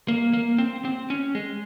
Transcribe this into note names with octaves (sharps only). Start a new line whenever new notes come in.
A#3
A#3
C4
C4
C#4
G#3